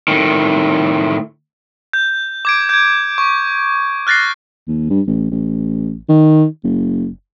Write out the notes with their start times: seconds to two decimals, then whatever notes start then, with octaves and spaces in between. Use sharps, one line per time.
0.08 A2 D#3
1.93 G6
2.45 D6 G#6 D7
2.69 G6 G#6
3.18 C#6
4.07 F6 F#6 A6 A#6 C7
4.67 D#2
4.90 G2
5.07 A1
5.31 A1
6.09 D#3
6.63 F#1